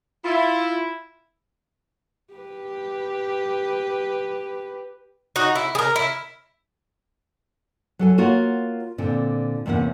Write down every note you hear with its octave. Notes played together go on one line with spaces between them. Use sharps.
E4 F4
G4 B4
D#4 F#4
E4
G#4 A#4
E4
F#3 A4 G#5
A#3 F4 F#4 C#5 F5 F#5
A#2 D3 C4
E2 C3 A#3 C#4 F#5